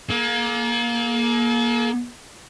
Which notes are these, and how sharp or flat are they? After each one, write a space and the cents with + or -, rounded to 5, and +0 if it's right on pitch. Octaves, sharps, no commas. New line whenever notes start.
A#3 +20 A4 -45